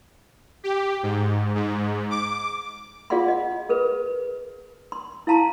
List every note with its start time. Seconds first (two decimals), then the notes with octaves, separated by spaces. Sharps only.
0.64 G4
1.03 G#2
1.55 G#2
2.11 D6
3.10 F4 G#4 D5 F5 F#5 C6
3.28 D#5 F#5
3.69 G#4 A#4 B4
4.92 C6
5.27 E4 F5 A5 A#5 C6